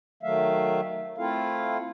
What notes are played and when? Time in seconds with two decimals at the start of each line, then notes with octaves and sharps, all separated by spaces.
0.23 D#3 F#3 A3 E5 F5
1.18 A3 C4 E4 F4 A4 F5